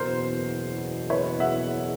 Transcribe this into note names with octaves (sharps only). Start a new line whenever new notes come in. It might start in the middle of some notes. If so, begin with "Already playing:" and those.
Already playing: F#1 E2 B2 A#4 C5
B4 C#5
E5 F#5